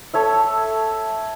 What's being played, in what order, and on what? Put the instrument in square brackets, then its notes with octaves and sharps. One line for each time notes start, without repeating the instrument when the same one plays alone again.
[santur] A4 C#5 E5